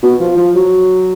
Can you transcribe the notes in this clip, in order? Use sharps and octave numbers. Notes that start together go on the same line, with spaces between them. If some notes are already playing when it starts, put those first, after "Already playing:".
B2
F3
F3
F#3